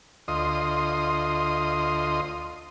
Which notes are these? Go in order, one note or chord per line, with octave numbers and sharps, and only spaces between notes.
D2 F4 D#5 C6 D#6